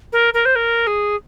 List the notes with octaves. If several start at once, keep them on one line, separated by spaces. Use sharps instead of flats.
A#4
A#4
C5
A#4
G#4